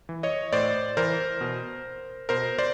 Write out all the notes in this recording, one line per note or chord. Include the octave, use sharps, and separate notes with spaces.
E3
C#5 D#5
A2 C5 D5
E3 A#4 C5
B2
B2 A#4 C5
C5 D5